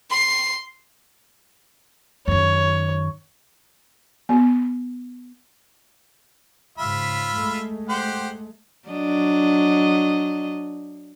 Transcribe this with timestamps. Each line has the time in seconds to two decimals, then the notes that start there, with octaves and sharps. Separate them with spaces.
0.10 C6
2.28 F#2 D#3 C#5
4.29 B3
6.78 G#2 C#3 F4 E5 B5
7.36 G#3 A3
7.89 G4 C5 F#5
8.88 F#3 D4 D#5